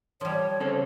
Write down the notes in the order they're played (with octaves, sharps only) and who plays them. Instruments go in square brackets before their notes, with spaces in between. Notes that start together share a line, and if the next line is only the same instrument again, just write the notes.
[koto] F3 G3 [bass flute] C#5
[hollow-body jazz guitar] C#3 C4 A4